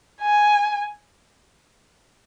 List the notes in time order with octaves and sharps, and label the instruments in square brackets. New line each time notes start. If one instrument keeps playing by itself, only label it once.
[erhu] G#5